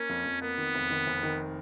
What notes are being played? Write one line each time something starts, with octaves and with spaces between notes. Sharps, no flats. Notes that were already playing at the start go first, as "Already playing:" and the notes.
Already playing: A#3 C#4
F2
F2
A#3 B3
D#3
F1
D#3
F1
D#3